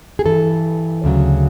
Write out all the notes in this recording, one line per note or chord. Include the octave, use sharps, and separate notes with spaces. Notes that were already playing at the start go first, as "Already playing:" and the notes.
G#4
G2 E3 A4
D2 C#3 F#3